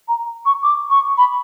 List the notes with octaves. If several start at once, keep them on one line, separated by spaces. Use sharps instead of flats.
A#5
C#6
D6
C#6
B5